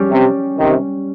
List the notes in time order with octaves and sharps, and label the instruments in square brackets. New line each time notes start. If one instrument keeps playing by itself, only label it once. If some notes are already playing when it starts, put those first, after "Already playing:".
Already playing: [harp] G3 C#4 G4
[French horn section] C3
C3 D#3